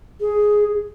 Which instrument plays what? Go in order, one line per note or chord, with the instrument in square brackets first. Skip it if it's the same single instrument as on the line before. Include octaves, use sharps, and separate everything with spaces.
[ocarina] G#4